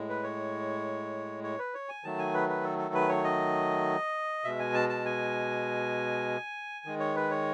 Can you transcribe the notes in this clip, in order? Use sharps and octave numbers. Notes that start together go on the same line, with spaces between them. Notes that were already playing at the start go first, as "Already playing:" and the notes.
Already playing: A2 G#3
B4
C#5
C#5
B4
C#5
G#5
D#3 F#3 A3 A5
G#5
B4
B4
A4
A4
B4
C#5
D#5
B2 G#3 E5
G#5
A5
A5
G#5
D#3 G#3
C#5
B4
C#5